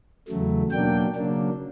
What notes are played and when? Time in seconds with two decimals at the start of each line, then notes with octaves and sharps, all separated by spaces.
0.28 E2 C#3 F#3 A3
0.71 B2 F#3 A#3 D4 G5
1.15 C#3 F#3 A#3 D4